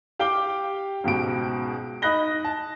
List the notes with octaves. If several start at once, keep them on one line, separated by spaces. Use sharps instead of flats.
G4 F5 G5 D6 G7
C#2 G#2 B2 D7
D#4 D#5 B5 F#6 A#6 G7
A5